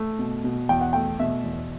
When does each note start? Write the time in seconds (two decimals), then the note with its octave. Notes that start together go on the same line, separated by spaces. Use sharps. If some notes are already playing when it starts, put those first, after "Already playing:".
Already playing: A3
0.19 B2
0.44 B2
0.69 E2 G5
0.81 F#5
0.93 A3 G5
1.19 B2 E5
1.44 E2